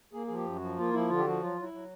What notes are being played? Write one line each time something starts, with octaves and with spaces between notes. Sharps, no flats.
A#3 G#4
F3 G#4
G4
F#2
F#4
F3
A#3 F4
F3 E4
D3 F4
G4
F3 F#4
F#3 F4
F#3
E4
F#3